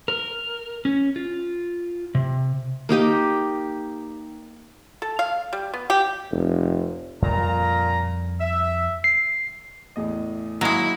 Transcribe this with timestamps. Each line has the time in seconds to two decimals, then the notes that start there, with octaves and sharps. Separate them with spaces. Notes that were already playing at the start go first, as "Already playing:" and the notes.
0.08 A#4
0.85 C#4
1.16 F4
2.15 C3
2.89 A#3 D#4 G4 D#5
5.02 A4
5.19 F5
5.53 G3
5.74 B3
5.90 G4
6.31 F1
7.22 F2 A#2 G3 A#5
8.40 E5
9.04 C7
9.96 E2 A2 D#5
10.61 F#3 G#3 A#3 E4 A#6